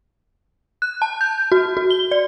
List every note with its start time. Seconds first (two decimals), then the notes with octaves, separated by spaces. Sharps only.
0.82 F#6
1.02 A5
1.21 G6
1.52 F#4
1.77 F#4
1.91 G7
2.11 D5